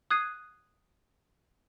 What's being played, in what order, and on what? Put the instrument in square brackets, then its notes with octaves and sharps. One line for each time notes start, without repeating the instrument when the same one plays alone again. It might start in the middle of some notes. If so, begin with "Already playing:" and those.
[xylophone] D#6 F#6 G#6 C7 D#7